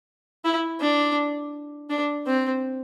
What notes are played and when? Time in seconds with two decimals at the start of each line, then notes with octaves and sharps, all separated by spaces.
0.45 E4
0.81 D4
1.90 D4
2.26 C4